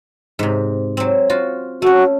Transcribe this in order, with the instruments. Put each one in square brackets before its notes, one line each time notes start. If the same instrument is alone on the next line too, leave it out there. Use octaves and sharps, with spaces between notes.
[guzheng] G#2 C3
F#3 C4
F4 F#4
[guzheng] A3 C#4 [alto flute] F#4